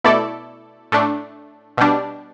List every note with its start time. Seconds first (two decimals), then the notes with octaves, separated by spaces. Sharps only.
0.04 B2 A3 E4 A4 D5
0.92 A2 A3 D4
1.77 B2 G3 D4